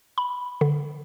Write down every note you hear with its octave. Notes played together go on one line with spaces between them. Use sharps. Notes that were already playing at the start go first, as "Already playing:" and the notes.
B5
D3